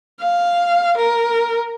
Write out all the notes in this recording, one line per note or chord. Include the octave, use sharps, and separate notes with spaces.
F5
A#4